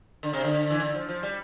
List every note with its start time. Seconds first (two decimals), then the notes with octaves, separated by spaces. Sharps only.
0.23 D3
0.33 C3
0.44 D3
0.70 E3
0.80 D3
0.95 F3
1.09 F3
1.23 G3